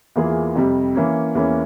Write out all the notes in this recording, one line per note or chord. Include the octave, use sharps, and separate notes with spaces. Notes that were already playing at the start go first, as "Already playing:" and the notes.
E2 E3 A#3 F4 G#4
F2 C3 G3
E3 A#3 C#4
E2 E3 A#3 C#4